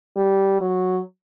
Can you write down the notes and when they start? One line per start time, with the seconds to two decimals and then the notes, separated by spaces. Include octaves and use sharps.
0.17 G3
0.61 F#3